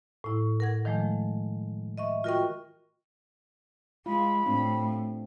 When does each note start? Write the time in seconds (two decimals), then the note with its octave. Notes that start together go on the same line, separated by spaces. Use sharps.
0.24 A2 E4
0.60 A#4 F#5 G#6
0.85 D#3 F3 G#3 A3
1.98 D#5 E5 C#6
2.24 F4 F#4 A#4 D#5 G5 C#6
4.06 G#3 F4 B5
4.46 A2 C4 D4